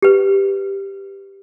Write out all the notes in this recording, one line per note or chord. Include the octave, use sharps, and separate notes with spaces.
G4 B4